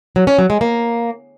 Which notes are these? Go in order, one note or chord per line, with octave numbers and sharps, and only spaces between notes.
F#3
C#4
F#3
G#3
A#3